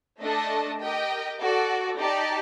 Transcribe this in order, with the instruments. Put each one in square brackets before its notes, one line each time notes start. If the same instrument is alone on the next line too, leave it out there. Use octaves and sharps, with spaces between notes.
[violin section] A3 D4 A4 D#5 A5
G4 A#4 D#5 G5
F#4 A4 D5
D#4 G4 D5 A5